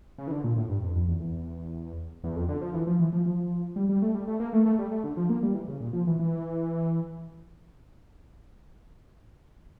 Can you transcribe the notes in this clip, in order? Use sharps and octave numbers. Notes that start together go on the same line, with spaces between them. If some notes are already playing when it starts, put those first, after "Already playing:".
C#3
E3
D3
A#2
A2
G2
F2
F2
E2
E2
E2
F2
D3
F3
E3
F3
E3
F3
F3
G3
G3
A3
G3
A3
A#3
A3
A3
G3
A3
D3
F3
A#3
G3
E3
C#3
A#2
F3
E3
E3